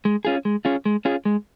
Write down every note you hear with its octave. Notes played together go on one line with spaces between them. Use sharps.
G#3
C#4 F4 G#4
G#3
C#4 F4 G#4
G#3
C#4 F4 G#4
G#3